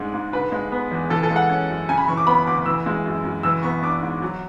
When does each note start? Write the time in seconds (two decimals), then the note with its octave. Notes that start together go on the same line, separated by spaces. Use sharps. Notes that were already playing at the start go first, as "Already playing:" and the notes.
Already playing: G#2 G#3 D4
0.14 G#2
0.32 D3 B4
0.52 G#3
0.72 B3
0.91 E2
1.10 E3 A4
1.23 A4
1.31 G#3
1.36 F#5
1.50 C#4
1.70 F#2
1.89 C#3 G#5
1.98 B5
2.08 E3 C#6
2.17 D6
2.27 B3 B5
2.47 D2 D6
2.66 E3 E6
2.86 G#3
3.06 F#2
3.24 F#2
3.43 E3 E6
3.63 B3 C#6
3.83 D4 D6
4.02 G#2
4.22 F#3